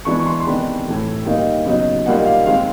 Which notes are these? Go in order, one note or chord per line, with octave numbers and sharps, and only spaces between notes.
E3 G#3 B3 D4 C#6
C#6
C6
C6
C3 D#3 G#3 B3 D4 B5
A2 E3 A3
D#3 G3 A#3 D#4 F5
C#3 F#3 B3 D#4
A#2 G3 A#3 D#4 F#5
F5
D#3 G#3 C4 F5